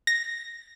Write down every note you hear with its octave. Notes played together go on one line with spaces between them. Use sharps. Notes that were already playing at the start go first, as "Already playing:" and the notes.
A#6